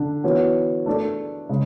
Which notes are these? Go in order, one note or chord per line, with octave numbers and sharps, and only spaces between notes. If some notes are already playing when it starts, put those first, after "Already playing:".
Already playing: D3 D4
E3 B3 F#4 C#5
A3 D4 A4 D5
C#3 G#3